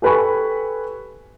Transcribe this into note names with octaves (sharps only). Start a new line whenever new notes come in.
G4 A4 B4 G#5 B5 C#6